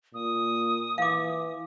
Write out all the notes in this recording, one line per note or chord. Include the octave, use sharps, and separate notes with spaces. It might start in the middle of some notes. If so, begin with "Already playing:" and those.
A#2 D#6
E3 F5 D6